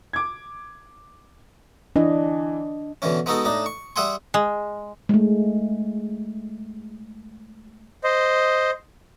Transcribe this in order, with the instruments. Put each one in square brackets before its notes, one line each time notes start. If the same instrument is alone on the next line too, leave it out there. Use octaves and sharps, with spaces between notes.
[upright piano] D6 G#6
[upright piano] E3 [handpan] D4 D#5
[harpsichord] B2 D3 E3 C#4
G#3 B3 D#4 F#4 A4
A2 D4 D#4
C#6
G3 G#4 E5 F#5 G#5 C6
[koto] G#3
[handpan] G#3 A3
[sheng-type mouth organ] C5 D#5